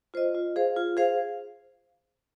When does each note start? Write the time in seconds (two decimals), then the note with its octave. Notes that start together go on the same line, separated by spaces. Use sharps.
0.14 F4 C5 D#5
0.35 F4
0.56 G#4 C5 F5
0.76 F4
0.97 G#4 C5 F5